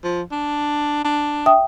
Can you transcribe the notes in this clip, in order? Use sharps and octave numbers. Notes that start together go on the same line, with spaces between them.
F3
D4
D4
E5 G5 D#6